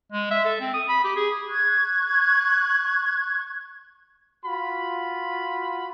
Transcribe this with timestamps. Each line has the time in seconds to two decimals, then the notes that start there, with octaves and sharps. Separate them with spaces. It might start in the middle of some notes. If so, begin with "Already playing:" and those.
0.12 G#3
0.31 E5
0.45 A4
0.60 C4
0.74 D#6
0.89 B5
1.04 G4
1.16 G#4
1.49 C#6 F#6 G#6
4.45 F4 F#4 B5